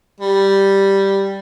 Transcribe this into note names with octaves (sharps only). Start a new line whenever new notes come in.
G3